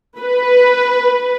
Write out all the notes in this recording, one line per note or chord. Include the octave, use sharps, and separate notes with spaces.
B4